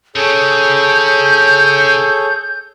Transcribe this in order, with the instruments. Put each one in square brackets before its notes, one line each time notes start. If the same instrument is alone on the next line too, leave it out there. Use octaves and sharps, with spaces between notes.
[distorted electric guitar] C#3 [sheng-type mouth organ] G#4 A4 C#5 [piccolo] G6